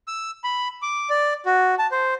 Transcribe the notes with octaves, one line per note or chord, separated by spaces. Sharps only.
E6
B5
D6
D5
F#4
A5
C5